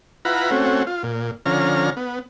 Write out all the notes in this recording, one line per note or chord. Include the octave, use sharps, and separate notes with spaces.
E4 F4 B4 F#5 A#5 B5
A3 C4 C#4 F#4
F4
A#2
D3 F3 C#4 A#5 F6
B3